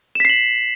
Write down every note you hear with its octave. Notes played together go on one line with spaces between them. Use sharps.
B6 C7 E7 F#7